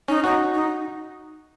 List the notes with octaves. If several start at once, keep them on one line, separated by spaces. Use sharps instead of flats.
C#4 D#4
D#4 F#4
D#4